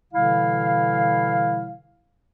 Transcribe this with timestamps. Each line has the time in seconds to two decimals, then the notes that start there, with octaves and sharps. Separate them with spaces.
0.13 B2 D3 E3 G3 E4 F5